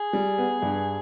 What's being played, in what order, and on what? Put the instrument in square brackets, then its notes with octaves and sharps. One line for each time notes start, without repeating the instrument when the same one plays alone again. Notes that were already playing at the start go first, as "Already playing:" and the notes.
Already playing: [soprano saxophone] G#4
[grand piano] G3
B3
G2